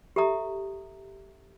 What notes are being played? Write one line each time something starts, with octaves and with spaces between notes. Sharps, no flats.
G4 A4 E5 A#5 D#6